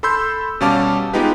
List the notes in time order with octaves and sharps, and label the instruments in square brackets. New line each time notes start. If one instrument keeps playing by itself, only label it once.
[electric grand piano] A4 B5 C6 E6 G6
B2 G3 C#4 F5 A5 D6
G#3 B3 D#4 F4 G4 B4